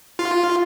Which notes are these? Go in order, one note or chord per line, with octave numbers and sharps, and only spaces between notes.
F4